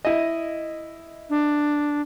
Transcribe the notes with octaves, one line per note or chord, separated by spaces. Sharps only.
E4 D#5
D4